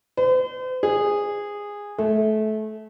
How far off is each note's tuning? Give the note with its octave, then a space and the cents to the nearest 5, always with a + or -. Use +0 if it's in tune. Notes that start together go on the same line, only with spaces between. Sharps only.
C5 -45
G#4 -15
A3 -25